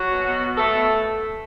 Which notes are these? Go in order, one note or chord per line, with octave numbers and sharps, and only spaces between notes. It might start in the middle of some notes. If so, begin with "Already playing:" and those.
Already playing: F#3 F#4
B2
B2
B3
A3 B3 A4
B2